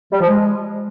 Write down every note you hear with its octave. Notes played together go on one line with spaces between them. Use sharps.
G3
F3
G#3